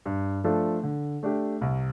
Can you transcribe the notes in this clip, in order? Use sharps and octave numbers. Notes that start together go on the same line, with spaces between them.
G2
F3 A3 D4 A4
D3
A3 D4 G4
C2